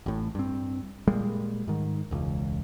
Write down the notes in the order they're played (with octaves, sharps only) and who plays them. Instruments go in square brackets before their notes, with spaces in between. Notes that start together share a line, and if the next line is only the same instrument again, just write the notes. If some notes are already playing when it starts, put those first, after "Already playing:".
[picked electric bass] A1 A2
G2 C4
A#2 G3 G#3 A#3
G#2 D#3
E1 C#2